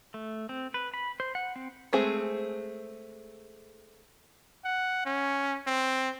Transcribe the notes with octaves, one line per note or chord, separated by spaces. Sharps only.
A3
C4
B4
B5
C5
F#5
C4
G#3 A3 C4 G#4
F#5
C#4
C4